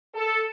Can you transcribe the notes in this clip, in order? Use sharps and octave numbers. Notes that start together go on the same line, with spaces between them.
A4